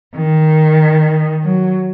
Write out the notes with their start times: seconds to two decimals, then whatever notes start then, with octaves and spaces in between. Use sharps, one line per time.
0.15 D#3
1.44 F#3